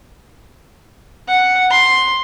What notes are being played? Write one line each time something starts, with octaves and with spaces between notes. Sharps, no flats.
F#5
C6